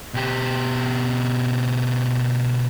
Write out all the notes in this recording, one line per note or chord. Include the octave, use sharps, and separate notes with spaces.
B2 G4